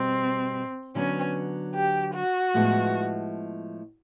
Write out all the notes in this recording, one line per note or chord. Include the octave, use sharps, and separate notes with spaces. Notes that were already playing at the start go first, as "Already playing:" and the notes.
Already playing: B2 G3 C4
D3 F#3 B3 C#4
G4
F#4
A2 F3 G#3 B3